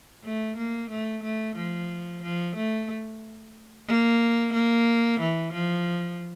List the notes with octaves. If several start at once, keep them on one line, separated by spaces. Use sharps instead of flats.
A3
A#3
A3
A3
F3
F3
A3
A#3
A#3
E3
F3